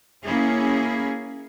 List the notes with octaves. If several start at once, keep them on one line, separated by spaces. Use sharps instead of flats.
A#3 C#4 E4 G#4